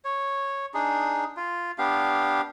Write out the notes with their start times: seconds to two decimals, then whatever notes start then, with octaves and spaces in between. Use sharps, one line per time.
0.05 C#5
0.74 D4 D#4 G#4
1.37 F4
1.78 B3 D4 G4 F5